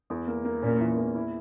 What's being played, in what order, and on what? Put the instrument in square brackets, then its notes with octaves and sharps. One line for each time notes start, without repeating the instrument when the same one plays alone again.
[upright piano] E2
A#3
A#3
[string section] A#2 [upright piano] C#4
[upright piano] E3
E2
E4